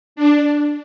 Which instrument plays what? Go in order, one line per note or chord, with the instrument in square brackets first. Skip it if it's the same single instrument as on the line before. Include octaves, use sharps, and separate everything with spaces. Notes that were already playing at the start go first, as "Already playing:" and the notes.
[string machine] D4